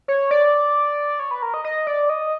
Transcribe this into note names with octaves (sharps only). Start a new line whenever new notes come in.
C#5
D5
C#5
B4
A#4
D#5
D#5
D5
D#5